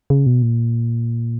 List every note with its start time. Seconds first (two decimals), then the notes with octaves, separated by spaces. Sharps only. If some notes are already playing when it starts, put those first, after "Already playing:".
0.10 C#3
0.26 B2
0.42 A#2